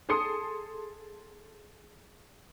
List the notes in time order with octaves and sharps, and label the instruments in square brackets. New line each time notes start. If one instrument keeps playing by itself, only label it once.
[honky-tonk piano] G#4 A4 C6 D#6 C#7